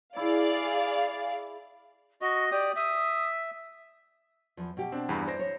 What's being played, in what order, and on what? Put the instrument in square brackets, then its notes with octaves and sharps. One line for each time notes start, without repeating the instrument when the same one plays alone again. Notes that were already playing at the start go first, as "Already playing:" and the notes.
[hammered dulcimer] E4 [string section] G#4 D5 F5
[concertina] F#4 D#5 [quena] C#6
[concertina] G4 D#6 [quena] D5
[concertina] E5 [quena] D#6
[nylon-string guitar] E2 F3
B2 G4
[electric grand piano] C4 D4
E2 G2 B5
[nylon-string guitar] E4 D5 [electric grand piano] C5 A#6
[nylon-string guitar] C#5